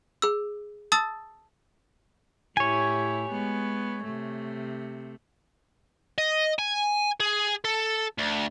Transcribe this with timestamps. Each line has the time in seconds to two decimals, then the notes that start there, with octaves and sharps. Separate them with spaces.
0.22 G#4 E6
0.92 A5 D#6 E6 A6
2.57 A2 E4 G4 C#5 G#5
3.31 G#3 B3
4.04 C3 A3
6.18 D#5
6.59 G#5
7.20 G#4
7.65 A4
8.18 D2